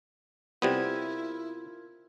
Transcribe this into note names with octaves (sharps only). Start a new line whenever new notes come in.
C3 G3 B3 E4 F4 A#4 G#6